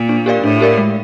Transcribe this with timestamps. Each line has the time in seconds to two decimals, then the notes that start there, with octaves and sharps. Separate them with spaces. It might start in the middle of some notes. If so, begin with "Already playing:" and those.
Already playing: A#2
0.09 D4
0.26 G4 A#4 D5 F5
0.43 A2 D4
0.60 G4 A#4 D5 F5
0.78 G#3